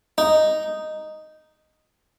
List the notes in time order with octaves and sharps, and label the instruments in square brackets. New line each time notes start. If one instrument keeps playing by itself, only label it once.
[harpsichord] D#4